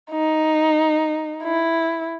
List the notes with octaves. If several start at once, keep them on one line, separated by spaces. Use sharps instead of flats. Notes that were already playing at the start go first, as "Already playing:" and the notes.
D#4
E4